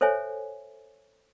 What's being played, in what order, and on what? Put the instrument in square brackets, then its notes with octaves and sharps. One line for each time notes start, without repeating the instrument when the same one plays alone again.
[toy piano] A4 C5 C#5 E5 G#5